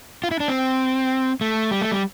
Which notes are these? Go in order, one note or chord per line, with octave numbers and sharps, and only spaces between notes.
F4
E4
D4
C4
A3
G3
A3
G3